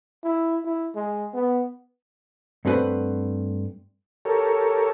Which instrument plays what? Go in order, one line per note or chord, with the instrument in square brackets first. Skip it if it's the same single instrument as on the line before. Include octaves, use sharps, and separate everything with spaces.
[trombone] E4
E4
G#3
B3
[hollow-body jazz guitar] G2 A3 C4 F4 B4 F#5
[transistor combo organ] G4 A4 A#4 C#5